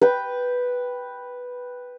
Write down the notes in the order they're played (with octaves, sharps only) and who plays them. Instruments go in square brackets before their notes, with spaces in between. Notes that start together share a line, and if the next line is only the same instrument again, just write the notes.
[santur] B4 G5